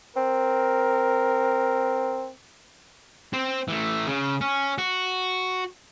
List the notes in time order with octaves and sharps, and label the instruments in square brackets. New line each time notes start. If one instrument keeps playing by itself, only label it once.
[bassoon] C4 [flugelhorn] A#4
[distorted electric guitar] C4 C5
E3 A3
C#3
C#4
F#4